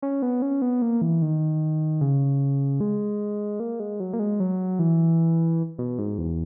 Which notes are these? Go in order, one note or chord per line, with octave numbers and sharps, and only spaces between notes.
C#4
B3
C#4
B3
A#3
E3
D#3
C#3
G#3
A#3
G#3
F#3
A#3
G#3
F#3
E3
B2
G#2
E2